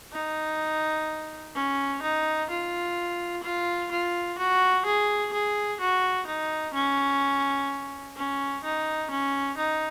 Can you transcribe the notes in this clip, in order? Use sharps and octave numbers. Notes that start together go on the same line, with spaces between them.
D#4
C#4
D#4
F4
F4
F4
F#4
G#4
G#4
F#4
D#4
C#4
C#4
D#4
C#4
D#4